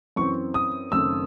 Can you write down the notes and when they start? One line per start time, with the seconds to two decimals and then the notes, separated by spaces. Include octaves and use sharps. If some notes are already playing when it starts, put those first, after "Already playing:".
0.16 F#2 E3 C4 C#6
0.54 D#6
0.92 F#1 F#2 D#3 A3 C4 E6